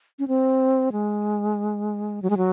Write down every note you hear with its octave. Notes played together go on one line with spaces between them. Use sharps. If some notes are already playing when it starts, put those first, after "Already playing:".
C#4
C4
G#3
F#3
G#3
F#3